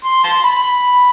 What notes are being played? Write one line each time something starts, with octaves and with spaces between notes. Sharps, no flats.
C6
A5 C6
B5
B5